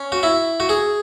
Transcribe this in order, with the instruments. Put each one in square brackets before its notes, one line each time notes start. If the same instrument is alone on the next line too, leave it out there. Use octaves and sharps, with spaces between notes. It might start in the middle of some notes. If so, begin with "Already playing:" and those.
Already playing: [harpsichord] C#4
F#4
E4
F#4
G#4